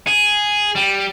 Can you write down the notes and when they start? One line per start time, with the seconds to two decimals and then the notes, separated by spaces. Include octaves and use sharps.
0.07 G#4
0.75 G3